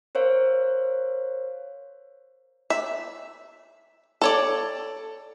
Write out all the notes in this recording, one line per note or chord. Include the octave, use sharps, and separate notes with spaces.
A#4 C5 C#5 F5
E5
A4 C#5 D5